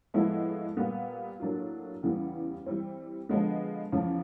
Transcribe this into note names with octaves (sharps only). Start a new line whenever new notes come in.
A2 F3 G#3 B3 E4
A#2 G3 B3
A2 F#3 A#3 D4 F4
E2 C#3 E3 G3 B3
E3 G3 C4
D3 F3 G#3 B3
E2 C#3 F3